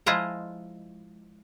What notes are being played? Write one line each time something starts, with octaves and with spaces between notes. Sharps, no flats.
F3 G#3 E4 F4 D#5 A#5